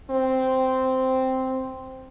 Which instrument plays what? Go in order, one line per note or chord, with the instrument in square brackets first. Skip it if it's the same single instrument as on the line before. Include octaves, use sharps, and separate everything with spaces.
[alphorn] C4